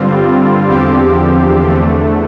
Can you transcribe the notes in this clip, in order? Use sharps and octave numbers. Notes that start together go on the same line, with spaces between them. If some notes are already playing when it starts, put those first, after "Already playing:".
Already playing: G2 D3 G3 C4 F4
E2 D3 F3 C4 G4
E2 D3 A3